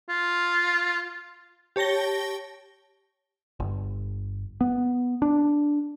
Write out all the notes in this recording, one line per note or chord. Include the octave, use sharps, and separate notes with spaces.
F4
G4 C#5 A5 A#6 G7
G1
B3
D4